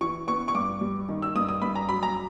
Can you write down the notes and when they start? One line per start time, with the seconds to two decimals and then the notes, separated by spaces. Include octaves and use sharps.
0.01 E3 C#6
0.27 B3 C#6
0.48 C#6
0.55 G2 D6
0.81 G3
1.09 D#3
1.22 E6
1.35 G2 D#6
1.49 D#6
1.62 G2 B5
1.75 A#5
1.89 F#3 B5
2.03 A#5